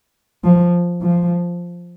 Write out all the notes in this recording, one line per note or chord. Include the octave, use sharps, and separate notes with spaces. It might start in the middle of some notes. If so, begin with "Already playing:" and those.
F3
F3